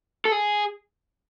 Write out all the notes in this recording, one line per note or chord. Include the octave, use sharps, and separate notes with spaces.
A4
G#4